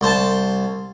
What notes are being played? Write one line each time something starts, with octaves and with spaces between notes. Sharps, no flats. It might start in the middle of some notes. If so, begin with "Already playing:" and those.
C2 C5 A5